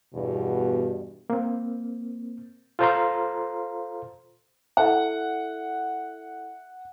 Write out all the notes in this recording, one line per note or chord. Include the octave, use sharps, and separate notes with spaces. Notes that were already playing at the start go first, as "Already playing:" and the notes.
E2 G2 B2
A#3 C4
F4 A4 C5 F5 A#5 C6
E4 A4 E5 F#5